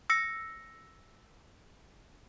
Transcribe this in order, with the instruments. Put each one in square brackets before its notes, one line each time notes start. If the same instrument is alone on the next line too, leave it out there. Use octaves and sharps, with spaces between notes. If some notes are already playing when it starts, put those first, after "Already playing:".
[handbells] E6 A#6 C#7